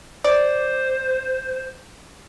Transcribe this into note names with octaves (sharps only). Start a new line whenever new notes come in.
C5 D5